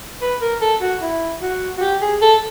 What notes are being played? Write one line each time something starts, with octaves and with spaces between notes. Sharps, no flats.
B4
A#4
A4
F#4
E4
F#4
F#4
G4
G#4
A4